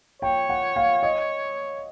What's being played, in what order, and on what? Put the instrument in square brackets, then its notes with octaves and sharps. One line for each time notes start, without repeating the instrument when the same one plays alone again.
[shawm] C#5 [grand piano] G5
[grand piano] F#5
F5
D#5